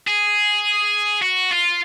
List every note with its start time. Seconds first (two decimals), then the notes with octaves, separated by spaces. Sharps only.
0.08 G#4
1.22 F#4
1.51 F4